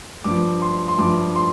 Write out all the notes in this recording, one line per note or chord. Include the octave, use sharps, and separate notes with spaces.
G2 F3 D6
C6
C6
G2 F3 D6
C6